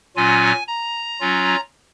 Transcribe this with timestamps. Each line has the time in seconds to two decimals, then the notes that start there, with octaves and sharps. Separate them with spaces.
0.16 A#2 F#3 C#4 F4 G#5
0.68 A#5
1.20 F#3 C#4 F4